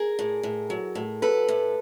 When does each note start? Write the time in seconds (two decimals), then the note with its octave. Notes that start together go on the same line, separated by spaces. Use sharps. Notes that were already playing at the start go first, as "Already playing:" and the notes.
Already playing: G#4 A#4
0.19 A2
0.43 A2
0.70 F#3
0.95 A2
1.22 F#3 A4 B4
1.48 A2